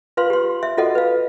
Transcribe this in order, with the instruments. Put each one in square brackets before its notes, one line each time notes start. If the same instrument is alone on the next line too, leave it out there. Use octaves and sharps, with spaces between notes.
[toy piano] F4 B4 F5 C6
G4 C6
E5
F4 F#4 A4 D#5 F#5
B4 F5